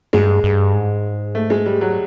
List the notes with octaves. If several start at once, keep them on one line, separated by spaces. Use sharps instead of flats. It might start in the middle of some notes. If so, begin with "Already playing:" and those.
G2 G#3
G2
G#2
A3
G#3
G3
F#3